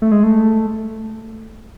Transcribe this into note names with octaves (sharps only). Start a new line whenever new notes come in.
A3
G#3
A3